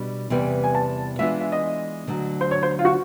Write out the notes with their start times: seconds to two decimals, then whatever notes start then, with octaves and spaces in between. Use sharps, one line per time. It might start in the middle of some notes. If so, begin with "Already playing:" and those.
Already playing: B2 G3 D4
0.30 E2 C3 E3 G3 B3
0.64 G#5
0.75 A5
1.19 E3 G#3 B3 D4 F4 E5
1.41 E5
1.52 D#5
2.07 D2 D3 F#3
2.41 C5
2.51 C#5
2.63 C5
2.79 F4
2.85 F#4